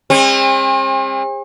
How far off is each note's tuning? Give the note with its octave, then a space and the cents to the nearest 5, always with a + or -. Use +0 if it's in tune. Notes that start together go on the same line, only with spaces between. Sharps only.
G#3 -45 C4 +45